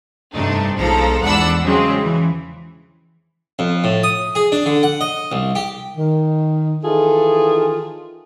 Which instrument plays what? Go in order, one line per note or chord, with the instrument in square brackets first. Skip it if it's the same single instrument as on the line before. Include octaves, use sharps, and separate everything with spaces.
[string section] G2 C3 A3 D4 D#4
B1 F3 G#3 A4 A#5
E2 G#2 D4 F#5 B5 E6
C#3 F#3 G#3 C4
E3
[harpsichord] F2
A2
D#6
G#4
D4
D3
F#5
D#5
C2
G4
[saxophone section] D#3
D#3 E3 F4 G#4 A4